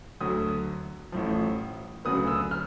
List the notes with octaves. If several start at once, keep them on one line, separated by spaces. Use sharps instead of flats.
D2 D3 F#3 D#6
A1 A2 F3
D2 C#3 F#3 B3 D#6
E6
F6